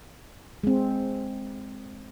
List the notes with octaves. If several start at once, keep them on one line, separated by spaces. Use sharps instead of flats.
G#3 C4